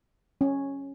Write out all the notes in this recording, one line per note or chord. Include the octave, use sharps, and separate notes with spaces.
C#4